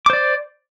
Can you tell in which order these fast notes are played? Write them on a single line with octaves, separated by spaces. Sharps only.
D6 C5 D5